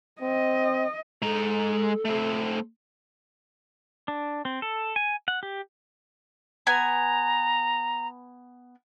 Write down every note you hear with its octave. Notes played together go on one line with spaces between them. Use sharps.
C4 D#5
G#3 A4 A#5
A3 C4
D4
C4
A4
G#5
F#5
G4
B3 G#5 A#5